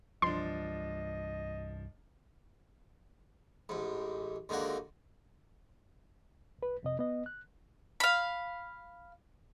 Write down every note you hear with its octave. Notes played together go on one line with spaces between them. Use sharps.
C2 G2 F3 D4 D#5 C6
A1 G#2
D#2 G#2 D3 A#3 F#4
C2 B4
F2 C3 D#5
B3 D#5
F#6
F5 B5